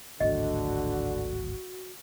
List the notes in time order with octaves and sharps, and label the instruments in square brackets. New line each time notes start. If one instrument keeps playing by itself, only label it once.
[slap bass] D1 G#1 D2 [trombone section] D3 [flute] F#4 [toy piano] D#5